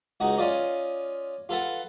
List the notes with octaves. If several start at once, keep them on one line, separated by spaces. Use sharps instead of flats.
C#2 D#4 F#4 F#5 A#5
C#4 F4 D5 D#5
F4 A4 B4 F#5